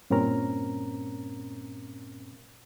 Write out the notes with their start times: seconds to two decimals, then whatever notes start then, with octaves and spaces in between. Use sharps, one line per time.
0.10 G2 A#2 C4 C#4 A#4 A#5